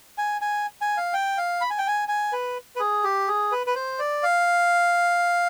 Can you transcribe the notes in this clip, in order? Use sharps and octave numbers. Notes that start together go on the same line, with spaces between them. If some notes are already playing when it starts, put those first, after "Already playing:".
G#5
G#5
G#5
F5
G5
F5
B5
G#5
G5
G#5
G#5
B4
B4
G#4
G4
G#4
B4
B4
C5
D5
F5